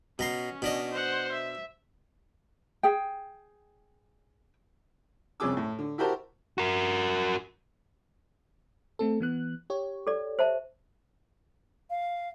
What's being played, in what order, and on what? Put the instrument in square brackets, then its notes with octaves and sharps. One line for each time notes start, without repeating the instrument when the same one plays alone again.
[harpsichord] B2 A#5 C6 [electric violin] C#4
[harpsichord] B2 D4 D#5
[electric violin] C5 F#5
E5
[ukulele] G#4 G5
[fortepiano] C2 F2 C#4 G#4 D6 E6
A2
D3
E4 F#4 G4 A#4 C5 A5
[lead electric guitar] F#4 A#4
[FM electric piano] A3 C4 A4
E3 B3 F#6
G4 C#5
[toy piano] A4 D5
C5 E5 A5
[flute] F5